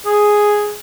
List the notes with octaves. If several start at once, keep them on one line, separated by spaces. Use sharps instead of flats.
G#4